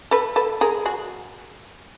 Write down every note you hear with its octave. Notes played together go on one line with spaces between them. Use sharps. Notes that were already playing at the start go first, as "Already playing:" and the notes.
A4 B4
A4 B4
G#4 A#4
F#4 G#4